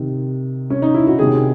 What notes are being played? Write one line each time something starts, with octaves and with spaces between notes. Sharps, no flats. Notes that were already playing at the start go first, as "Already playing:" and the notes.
Already playing: C3 D#3
C#4
D#4
E4
F#4
C3 D#3 G#4